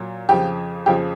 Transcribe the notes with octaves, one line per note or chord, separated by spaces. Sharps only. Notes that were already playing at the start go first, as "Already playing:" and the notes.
Already playing: A#2 F#3
F2 C#3 F3 G4
F2 C#3 F3 G4